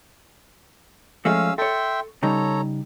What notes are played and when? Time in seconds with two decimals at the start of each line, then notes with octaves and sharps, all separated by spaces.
1.25 F3 G#3 A3 C#4 F5 E6
1.58 A4 C#5 E5 G5 C6
2.23 C#3 G3 D#4 A4 C#5 A#5